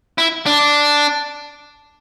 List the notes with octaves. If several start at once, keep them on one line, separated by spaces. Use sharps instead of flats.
E4
D4